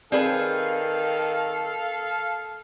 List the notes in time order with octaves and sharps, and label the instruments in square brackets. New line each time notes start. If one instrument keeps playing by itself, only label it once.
[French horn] D#3 [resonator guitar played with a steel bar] C4 G#4 B4 [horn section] A4 F5 [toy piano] D5